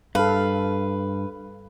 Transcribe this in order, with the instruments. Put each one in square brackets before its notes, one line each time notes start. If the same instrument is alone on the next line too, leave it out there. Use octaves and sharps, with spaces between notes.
[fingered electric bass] G2 [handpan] A4 F5 [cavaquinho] B4